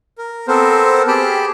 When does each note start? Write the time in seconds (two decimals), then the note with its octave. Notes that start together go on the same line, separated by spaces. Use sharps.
0.18 A#4
0.48 B3 C4 A4 A#4 C5
1.08 G4 G#4 G5 A5 B5